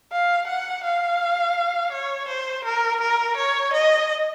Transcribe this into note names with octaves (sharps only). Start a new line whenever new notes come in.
F5
F#5
F5
C#5
C5
A#4
A#4
C#5
D#5